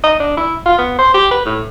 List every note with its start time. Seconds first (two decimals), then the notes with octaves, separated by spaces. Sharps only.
0.04 D#5
0.20 D4
0.37 E4
0.65 F4
0.78 B3
0.99 C5
1.14 G4
1.31 B4
1.45 A2